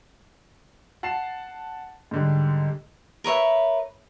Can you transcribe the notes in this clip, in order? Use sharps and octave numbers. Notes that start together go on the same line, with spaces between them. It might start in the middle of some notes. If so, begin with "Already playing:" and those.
F#5 A5 A6 C7 E7
G#2 D3 G3
A#4 B4 C#5 E5